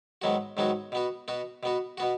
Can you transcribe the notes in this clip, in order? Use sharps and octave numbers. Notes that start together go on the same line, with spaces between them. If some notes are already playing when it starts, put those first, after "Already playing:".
G#2 D#3 F#3 B3 F#4
G#2 D#3 F#3 B3 F#4
B2 B3 F#4
B2 B3 F#4
B2 B3 F#4
B2 B3 F#4